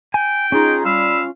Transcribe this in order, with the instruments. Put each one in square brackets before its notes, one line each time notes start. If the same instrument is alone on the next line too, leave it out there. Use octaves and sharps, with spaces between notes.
[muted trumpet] G5 [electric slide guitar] G#5
[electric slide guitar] C#4 F4 [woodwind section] D#4 G#4
[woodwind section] G3 B5 E6 [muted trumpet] F5